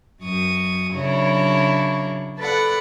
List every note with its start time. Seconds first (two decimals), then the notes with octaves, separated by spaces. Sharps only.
0.21 F#2 C#6 D#6
0.94 C#3 F#3 D4 E4 A#4 C#5
2.38 A4 B4 D5 F#5